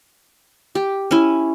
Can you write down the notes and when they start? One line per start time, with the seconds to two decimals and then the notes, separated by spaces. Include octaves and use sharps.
0.75 G4
1.11 C#4 E4